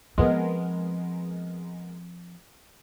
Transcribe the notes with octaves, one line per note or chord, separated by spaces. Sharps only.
F3 G#3 B3 C4 A#4